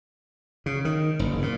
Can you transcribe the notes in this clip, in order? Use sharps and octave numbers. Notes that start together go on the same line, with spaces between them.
C#3
D#3
F#1
A#2